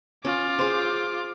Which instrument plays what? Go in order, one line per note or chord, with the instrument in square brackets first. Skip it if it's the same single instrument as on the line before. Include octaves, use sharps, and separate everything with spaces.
[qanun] C#4 [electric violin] F4 D6
[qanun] G#4 C5